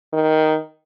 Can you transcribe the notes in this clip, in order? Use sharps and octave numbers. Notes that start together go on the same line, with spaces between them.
D#3